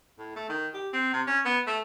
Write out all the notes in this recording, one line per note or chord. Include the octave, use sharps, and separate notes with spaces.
A2
A3
D#3
G4
C4
C3
C#4
B3
A3